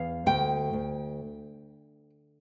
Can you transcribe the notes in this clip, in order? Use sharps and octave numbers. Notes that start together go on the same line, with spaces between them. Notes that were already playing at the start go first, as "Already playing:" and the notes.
Already playing: E2 F5
D2 G5
D2